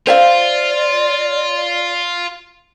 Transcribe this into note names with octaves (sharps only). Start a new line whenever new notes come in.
F4 C5 D5 E5 F5